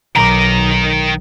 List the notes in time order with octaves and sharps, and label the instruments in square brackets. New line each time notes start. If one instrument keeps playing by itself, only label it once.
[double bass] B1 [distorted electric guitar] D#3 A#4 [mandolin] A#5 D6